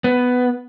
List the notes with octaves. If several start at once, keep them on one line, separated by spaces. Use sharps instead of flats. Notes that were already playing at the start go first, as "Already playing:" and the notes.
B3